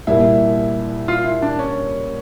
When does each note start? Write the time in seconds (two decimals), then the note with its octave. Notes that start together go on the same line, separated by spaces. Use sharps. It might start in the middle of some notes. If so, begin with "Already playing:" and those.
0.07 C2 A#2 G3 E4
1.08 F4
1.24 E4
1.42 D4
1.59 C#4